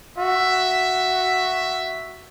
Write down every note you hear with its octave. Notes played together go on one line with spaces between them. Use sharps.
F#4 E5